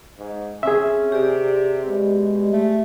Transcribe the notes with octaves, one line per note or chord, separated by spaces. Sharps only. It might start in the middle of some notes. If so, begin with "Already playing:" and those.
G#2
C4 C#4 G#4 E5
C3 G4 D5
B2 G#3
A3